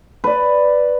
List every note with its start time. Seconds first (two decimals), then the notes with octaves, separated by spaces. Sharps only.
0.24 B4 D5